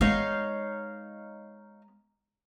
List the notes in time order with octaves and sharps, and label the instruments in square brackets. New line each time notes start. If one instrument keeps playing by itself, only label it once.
[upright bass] G#3 B3 [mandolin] D#4 C#5 F5